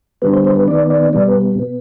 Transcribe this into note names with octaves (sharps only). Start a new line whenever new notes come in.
D3 G3 B3 B4
C5
C5
B4
D#3 B3 D5
D5
B2 G3 B3 D5
B4
B2 B3